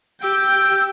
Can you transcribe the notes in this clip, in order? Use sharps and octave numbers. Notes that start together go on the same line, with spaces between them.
G4 G5 E6